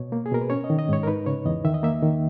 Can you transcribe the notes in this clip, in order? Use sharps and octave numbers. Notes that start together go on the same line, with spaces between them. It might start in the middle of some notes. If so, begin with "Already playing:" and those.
Already playing: B2 C#5
A#3
G#4
B2 A#4
B4
C#4 C#5
D#5
D#3
D#5
G#2 C#5
A#4
D#4 B4
C#3 C#5
E2 D#5
D#3 E5
D#5
A#3 E5
D#3